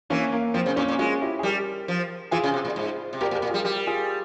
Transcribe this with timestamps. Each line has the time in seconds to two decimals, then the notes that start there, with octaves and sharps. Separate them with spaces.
0.10 E3 A#3 C#4
0.32 A#3
0.54 F3 C4
0.66 C#3
0.76 A#2 A#3 C#4
0.88 A#2
0.99 G#3 C#4 F4
1.21 E4 G4
1.39 G#4
1.43 G3 G4 A#4
1.88 F3
2.31 E3 F4 G#4
2.44 C#3
2.54 C3
2.65 A#2
2.76 G#2
3.13 C3
3.21 A#2 G4 A#4
3.31 A#2
3.35 G4 A#4
3.42 A#2
3.50 G3 F4 G#4
3.64 G3 G4 A#4
3.87 F4 G#4